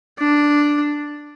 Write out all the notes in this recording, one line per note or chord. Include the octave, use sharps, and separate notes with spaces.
D4